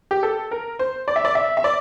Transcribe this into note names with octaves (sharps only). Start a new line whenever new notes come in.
G4
A4
A#4
C5
D5
E5
D5
E5
E5
D5